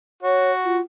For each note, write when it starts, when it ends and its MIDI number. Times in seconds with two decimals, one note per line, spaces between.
0.23 0.78 66
0.23 0.51 73
0.65 0.80 65